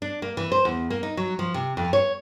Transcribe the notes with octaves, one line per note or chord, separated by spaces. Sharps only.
D4
A#3
E3
C5
E2
A#3
D#4
F#3
F3
C3
F2
C#5